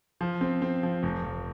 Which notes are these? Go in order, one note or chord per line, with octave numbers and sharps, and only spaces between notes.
F3
C4
C4
F3
F1
F1